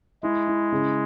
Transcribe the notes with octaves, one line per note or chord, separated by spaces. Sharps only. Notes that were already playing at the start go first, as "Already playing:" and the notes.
G#3 E4
E4
C#3